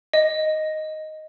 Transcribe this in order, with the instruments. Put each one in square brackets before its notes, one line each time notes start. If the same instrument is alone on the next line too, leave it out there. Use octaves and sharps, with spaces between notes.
[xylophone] D#5